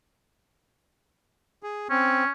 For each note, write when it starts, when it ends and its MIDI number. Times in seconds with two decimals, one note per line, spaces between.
1.63 1.88 68
1.90 2.24 60
1.90 2.32 61